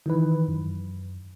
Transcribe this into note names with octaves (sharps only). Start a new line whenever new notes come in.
D#3 E3 B4
F#2